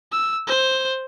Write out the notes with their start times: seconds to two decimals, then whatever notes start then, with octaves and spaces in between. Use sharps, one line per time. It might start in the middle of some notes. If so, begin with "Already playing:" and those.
0.12 E6
0.47 C5